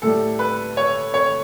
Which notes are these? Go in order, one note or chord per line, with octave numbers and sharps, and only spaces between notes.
A2 G3 A4
B4
C#5
C#5